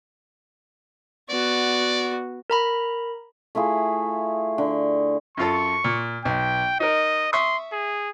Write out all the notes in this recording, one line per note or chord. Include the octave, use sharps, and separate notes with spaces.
B3 F#4 D5
A#4 A#5 B5
A3 E4 F4 G#4
D3
F#2 F4 A4 C#6
A#2
B1 G5
D#4 A#4 D#5
E5 C6 C#6 D#6
G#4